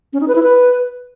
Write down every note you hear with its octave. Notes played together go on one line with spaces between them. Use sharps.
C#4
D#4
B4
E4
B4